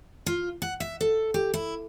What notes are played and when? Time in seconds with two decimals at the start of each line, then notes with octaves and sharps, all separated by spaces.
0.26 F4
0.62 F#5
0.80 E5
1.01 A4
1.34 G4
1.54 E4